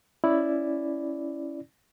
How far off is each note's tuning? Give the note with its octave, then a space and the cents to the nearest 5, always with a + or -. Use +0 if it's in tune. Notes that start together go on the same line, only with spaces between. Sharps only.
C#4 +0 E4 +0 D5 +0